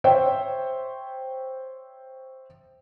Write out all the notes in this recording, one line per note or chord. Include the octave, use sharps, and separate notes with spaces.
C5 C#5 E5 G5